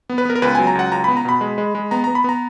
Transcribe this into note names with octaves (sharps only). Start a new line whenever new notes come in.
B3
B4
B3 A#4
A#4
C#2 B4
F#3 G#5
A#5
C#2 F#5
C#2 A#5
B3 B5
A#5
B2 B5
G#3
G#3
G#3
B3 A#5
B3 A#5
B5
B3 A#5